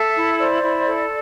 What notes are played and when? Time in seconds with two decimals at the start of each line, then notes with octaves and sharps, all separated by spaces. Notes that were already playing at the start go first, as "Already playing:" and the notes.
Already playing: A4 E5
0.16 E4
0.39 C5 D5
0.62 E4
0.86 A4